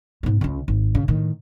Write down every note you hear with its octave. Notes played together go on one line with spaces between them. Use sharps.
G#2 B3
C#2 C#4
G#1
C#3
A2 D#3